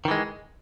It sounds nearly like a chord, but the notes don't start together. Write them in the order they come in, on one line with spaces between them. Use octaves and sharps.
D#3 E3 G#3